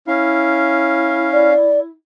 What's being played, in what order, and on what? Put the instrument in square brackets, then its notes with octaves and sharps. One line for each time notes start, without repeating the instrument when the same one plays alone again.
[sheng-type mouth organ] C#4 F5 [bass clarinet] E4
[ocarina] D5